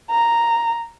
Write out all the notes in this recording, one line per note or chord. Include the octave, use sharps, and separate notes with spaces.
A#5